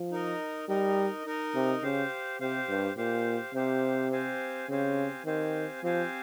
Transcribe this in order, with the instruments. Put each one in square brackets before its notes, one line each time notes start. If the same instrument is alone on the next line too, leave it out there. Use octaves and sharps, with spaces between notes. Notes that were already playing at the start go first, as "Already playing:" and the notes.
Already playing: [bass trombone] F3
[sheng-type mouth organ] D#4 A#4 D#5
[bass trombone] G3 [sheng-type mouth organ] D#4 A#4 D#5
[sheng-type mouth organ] D#4 A#4 D#5
[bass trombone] C3
[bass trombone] C#3 [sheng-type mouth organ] G4 C5 F5
[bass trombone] C3 [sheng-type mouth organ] G4 C5 F5
[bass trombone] G2
[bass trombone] A#2 [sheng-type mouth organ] G4 C5 F5
[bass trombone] C3 [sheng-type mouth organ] G4 C5 F5
[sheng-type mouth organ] C4 G4 C5 F5 G#5
[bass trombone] C#3 [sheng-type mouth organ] C4 G4 C5 F5 G#5
[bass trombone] D#3 [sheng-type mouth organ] C4 G4 C5 F5 G#5
[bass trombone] F3 [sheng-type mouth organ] C4 G4 C5 F5 G#5